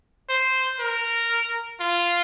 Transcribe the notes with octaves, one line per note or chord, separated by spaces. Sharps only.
C5
A#4
F4